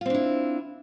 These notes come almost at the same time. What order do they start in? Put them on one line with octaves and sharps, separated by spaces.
F4 C4 D4 E4